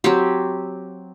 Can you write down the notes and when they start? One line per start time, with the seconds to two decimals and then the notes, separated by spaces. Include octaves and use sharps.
0.04 F#3 C4 G4